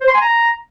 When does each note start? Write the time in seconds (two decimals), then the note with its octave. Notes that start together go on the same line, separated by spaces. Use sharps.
0.01 C5
0.08 C6
0.14 G#5
0.21 A#5